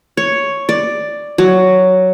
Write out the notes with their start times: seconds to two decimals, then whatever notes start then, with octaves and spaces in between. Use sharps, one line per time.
0.17 C#5
0.69 D5
1.38 F#3